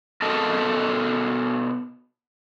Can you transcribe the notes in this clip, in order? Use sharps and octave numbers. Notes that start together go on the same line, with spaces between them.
B2 A4 A#4 D#5 A5